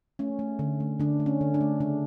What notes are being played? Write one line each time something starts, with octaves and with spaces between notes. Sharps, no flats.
A3 C#4
A3
D3
A3
D3 D4
A3
C#4
D3
D4
A3
C#3 D4